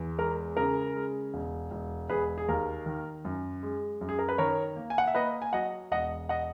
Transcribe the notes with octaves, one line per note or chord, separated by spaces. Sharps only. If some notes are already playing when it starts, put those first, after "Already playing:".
Already playing: E2
G#3 A#4
C#3 A#4
G#3
E1
E1
E1 G#4 B4
G#4
D#2 A#4
D#3
F#2
G#3
F#2
G#4
A#4
B4
D#3 A#4 C#5
A#3
G#5
F#5
E5
A#3 B4 D#5
G#5
F#3 D#5 F#5
E1 D#5 F#5
D#5 F#5